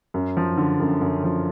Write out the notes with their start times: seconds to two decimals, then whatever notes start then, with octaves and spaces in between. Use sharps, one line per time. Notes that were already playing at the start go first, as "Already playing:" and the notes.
0.14 F#2
0.37 F3
0.57 D3
0.80 F#2
1.01 F#2
1.24 F3